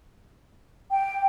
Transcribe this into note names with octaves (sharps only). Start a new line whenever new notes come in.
G5